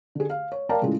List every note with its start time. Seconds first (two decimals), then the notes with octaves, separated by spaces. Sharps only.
0.15 D3 G#4
0.30 F5
0.52 C#5
0.69 A#4 D5 F5 G5 A5 A#5
0.81 A2 C#3 E3 G#3 E4 F4